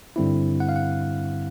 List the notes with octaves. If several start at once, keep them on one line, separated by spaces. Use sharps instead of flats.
G2 D3 G3 C4 E4
F#5
F5
F#5